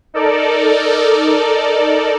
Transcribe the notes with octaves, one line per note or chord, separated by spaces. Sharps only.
D#4 A4 A#4 D5